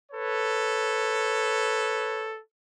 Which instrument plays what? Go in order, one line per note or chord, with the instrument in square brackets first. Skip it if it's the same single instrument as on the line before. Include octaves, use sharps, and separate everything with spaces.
[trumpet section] A4 B4 C#5